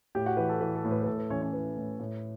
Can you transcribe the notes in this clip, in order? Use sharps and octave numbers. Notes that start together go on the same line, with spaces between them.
A2 G4 G5
F#4 F#5
E3 B4
A4
E3 B4
A4
A2
B4
B4
A2 A4
B4
E3 C#4 C#5
C#4 C#5
E3 B4
A2
A2